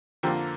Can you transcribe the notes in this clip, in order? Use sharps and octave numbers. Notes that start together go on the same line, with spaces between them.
F2 D3 F3 A#3 G4